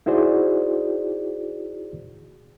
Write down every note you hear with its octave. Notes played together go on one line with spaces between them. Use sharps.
D#4 E4 F#4 G#4 C5 D5